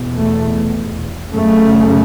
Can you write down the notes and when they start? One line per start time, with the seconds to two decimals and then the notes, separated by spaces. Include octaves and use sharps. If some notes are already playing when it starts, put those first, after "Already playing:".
Already playing: E2 B2
0.16 A3
1.31 F#2 C#3 A3